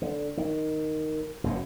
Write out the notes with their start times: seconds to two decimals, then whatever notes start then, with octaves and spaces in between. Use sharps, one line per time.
0.02 D3
0.37 D#3
1.44 F#1 F#2 B2